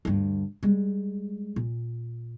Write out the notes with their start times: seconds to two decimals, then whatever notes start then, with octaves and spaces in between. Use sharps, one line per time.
0.05 D2 G2
0.63 G3 G#3
1.56 A#2